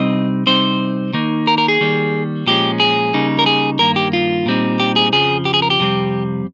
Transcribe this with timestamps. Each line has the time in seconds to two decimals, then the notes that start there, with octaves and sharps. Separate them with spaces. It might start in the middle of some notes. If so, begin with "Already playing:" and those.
Already playing: C3 G3 C4 D#4 D#5
0.47 C3 G3 C4 D#4 C5
1.13 D#3 A#3 D#4
1.47 A#4
1.58 A#4
1.68 G#4
1.81 D#3 G3 A#3
2.47 A#2 F3 G#3 C#4 G4
2.80 G#4
3.13 C#3 G3 A#3 D#4
3.39 A#4
3.46 G#4
3.79 G2 D#3 A#3 A#4
3.96 G4
4.13 F4
4.46 A#2 G3 C4 D#4
4.80 G4
4.96 G#4
5.13 F2 C#3 F3 G#4
5.45 G4
5.54 G#4
5.62 A#4
5.70 G4
5.80 F2 C3 G3 C4